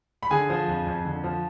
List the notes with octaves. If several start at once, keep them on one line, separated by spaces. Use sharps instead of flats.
B5
D3 G#4 G#5
F3
F2
F2
D3
F3